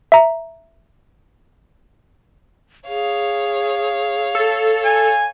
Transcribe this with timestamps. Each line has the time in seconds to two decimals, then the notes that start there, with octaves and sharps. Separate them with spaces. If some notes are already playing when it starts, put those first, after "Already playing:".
0.12 E5 A#5
2.88 G#4 C#5 F5
4.35 A4
4.85 G#5